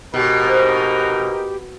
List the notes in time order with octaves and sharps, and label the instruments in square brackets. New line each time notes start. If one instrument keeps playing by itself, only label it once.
[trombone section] G#2 D#4 A#4 [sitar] B2 [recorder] G4
[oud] C4